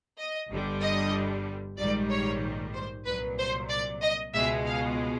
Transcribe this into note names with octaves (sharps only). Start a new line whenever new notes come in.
D#5
G1 G2 D3 G3
D#5
A#1 G#2 D#3 G3 D5
C#5
C5
C2 A#2 F#3 B4
C5
D5
D#5
C#2 B2 G#3 E5
F5